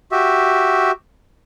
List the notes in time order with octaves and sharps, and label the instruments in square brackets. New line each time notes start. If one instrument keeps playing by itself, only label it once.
[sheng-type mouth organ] F#4 G4 E5